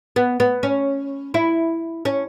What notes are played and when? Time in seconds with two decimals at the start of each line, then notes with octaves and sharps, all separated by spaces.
0.16 B3
0.40 B3
0.63 C#4
1.34 E4
2.05 C#4